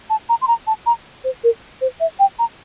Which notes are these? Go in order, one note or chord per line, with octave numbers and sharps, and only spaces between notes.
A5
A#5
C6
A#5
A5
A#5
C5
A#4
C5
E5
G5
A#5